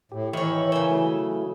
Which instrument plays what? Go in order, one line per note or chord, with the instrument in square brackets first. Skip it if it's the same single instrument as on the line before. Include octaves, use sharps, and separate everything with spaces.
[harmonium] A2 [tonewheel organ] G4
[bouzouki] D#3 C#5 [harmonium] E3 [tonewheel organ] E5 B5 C#6
[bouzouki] C#3 G#5 [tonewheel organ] A#4 E6 G6
[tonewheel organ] F#3 A3 E4